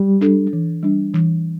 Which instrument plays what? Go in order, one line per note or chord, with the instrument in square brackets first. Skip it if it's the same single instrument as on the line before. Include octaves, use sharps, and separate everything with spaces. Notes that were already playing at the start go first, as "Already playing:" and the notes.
Already playing: [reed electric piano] G3
[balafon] D4 A4
E3
G3 D4
E3